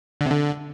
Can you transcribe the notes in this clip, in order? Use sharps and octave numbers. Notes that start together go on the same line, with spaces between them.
D3
C3
D3